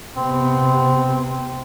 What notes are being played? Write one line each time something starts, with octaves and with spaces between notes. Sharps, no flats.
C3 B3 C4